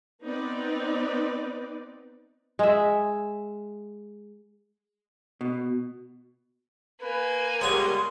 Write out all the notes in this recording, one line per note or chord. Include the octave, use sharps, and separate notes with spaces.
B3 C4 D#4 B4 D5
G#3 E5
B2
A#3 B4 G#5
G3 G#3 B3 C#5 F#5 C6 C#6